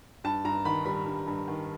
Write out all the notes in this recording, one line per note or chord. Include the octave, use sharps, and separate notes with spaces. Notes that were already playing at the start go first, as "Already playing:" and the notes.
G2 A5
G2 A#5
D#3 B5
G3 B5
G2
G2
D#3